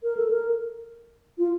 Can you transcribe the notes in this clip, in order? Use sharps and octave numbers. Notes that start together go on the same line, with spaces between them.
A#4
A4
A#4
F4